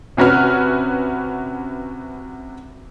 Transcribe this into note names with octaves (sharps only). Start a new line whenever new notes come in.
C3 C#4 F#4 B4 F6